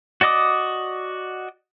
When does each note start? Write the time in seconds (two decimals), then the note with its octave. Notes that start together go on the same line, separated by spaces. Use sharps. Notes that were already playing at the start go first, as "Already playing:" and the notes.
0.21 F#4 D5 D#5 D6 D#6